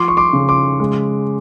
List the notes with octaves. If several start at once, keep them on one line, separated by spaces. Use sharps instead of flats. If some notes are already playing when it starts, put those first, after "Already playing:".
Already playing: F3 C6 D6
C#6
C6 D6
C#3
C6 D6
G#3